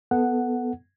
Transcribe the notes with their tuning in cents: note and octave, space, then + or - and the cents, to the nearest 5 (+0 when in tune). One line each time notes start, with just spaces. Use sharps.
B3 +0 A4 +0 F#5 +0